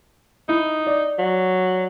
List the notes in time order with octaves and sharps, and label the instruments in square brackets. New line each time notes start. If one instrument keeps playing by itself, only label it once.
[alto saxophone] D#4 [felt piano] E4
[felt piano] D5
[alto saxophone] F#3